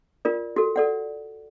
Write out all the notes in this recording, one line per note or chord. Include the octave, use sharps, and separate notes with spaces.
F4 A#4 D5
F#4 A4
A4 D5 F#5